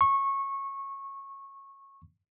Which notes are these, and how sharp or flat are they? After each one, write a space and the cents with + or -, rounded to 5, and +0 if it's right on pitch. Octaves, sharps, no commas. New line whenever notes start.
C#6 -20